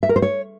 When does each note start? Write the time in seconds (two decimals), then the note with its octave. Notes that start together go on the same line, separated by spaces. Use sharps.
0.03 E5
0.09 A#4
0.16 C5
0.22 C#5